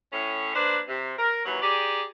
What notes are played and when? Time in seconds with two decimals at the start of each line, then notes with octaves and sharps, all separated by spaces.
0.13 A2 C#4
0.55 A#3 D4 B4 C5
0.89 C3
1.18 A#4
1.46 D#2 E3 F#3
1.62 D#4 G4 G#4 D5